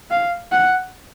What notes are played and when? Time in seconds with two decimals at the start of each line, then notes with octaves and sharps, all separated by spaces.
0.11 F5
0.52 F#5